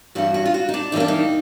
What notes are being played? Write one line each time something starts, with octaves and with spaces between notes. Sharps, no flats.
G2 E3 G3 A#3 C#4 F#4
F#4
F4
F#4
D#4
D4
G2 E3 G3 A#3 C#4 D#4
D4
D#4